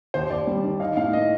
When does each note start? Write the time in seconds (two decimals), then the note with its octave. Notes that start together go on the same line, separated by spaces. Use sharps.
0.14 D#2 C5
0.30 D#2 D5
0.47 G3
0.64 D#3
0.80 D#4 F5
0.97 A2 F5
1.13 A#3 D#5